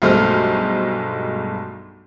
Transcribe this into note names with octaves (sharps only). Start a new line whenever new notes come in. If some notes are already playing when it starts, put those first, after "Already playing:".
B1 G2 G#3 A3 C5 F6